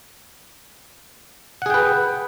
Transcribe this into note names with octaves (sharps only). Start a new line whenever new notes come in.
G#4 B4 F#5 G5